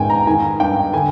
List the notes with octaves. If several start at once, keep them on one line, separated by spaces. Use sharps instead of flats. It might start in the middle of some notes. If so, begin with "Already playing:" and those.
Already playing: G#2 D#3 G5 G#5
A#5
D#3 G#5
G2 G5
D3 G#5